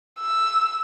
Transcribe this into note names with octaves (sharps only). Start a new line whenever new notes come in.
E6